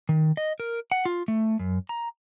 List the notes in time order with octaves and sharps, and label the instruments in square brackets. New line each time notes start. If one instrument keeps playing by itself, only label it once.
[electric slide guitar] D#3
D#5
A#4
F#5
F4
A3
F#2
A#5